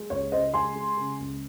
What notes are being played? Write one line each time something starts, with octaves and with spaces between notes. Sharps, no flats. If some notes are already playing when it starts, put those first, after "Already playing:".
Already playing: G#3
C#2 C#5
C#3 C5 D#5
G#3 G#5 C6
G#3
C#3
C#2